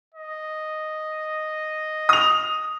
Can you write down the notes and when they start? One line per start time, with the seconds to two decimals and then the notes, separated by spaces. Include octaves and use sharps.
0.15 D#5
2.09 D#6 F7